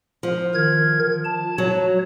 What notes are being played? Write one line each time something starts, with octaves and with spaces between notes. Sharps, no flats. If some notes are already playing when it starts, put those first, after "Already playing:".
F3
D#3 A#4 G#6
A5
F#3 C#5